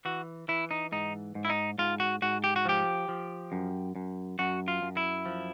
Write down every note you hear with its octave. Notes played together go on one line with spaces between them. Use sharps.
E3 F#4
E3 E4
D#4
G#2 D#4
G#2
E4
D#4
G#2 F4
F#4
G#2 F#4
G4
F#4
F3 G4
F3
F#2
F#2
F#2 F#4
F4
F#2
E4
F3